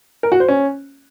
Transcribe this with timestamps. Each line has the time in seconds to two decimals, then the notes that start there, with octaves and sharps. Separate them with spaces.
0.23 A#4
0.32 F#4
0.40 C5
0.48 C#4